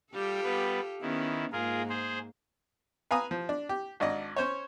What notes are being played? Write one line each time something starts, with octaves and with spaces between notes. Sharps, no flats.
G3 F4 G4 A4
G3 B3 B4
D#3 B3 C#4 E4
G#2 A#3 F4 G#4 A#4
G#4 C5
B4 F5 G#5 A#5 D#6
F3
D4
G4
G#1 D4 D#5
C#4 C5 C#5